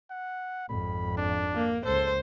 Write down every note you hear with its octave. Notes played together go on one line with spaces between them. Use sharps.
F#5
G#1 F2 B5
D4
A#3
C#2 A4 C5